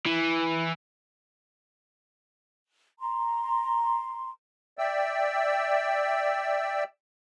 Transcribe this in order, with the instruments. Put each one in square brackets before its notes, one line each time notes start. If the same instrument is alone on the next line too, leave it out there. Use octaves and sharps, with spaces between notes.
[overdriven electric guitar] E3
[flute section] A#5 C6
[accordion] D5 E5 G5 E6